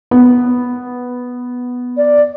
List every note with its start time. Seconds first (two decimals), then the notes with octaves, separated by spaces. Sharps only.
0.11 B3
1.97 D5